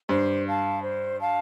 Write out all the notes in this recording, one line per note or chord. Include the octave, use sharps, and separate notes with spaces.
G2 C5
F5 A5
C5
F5 A5